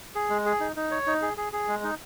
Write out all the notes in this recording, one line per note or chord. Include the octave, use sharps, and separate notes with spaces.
G#4
G#3
G#4
D#4
D#4
C#5
D#4
G#4
G#4
G#4
G#3
D#4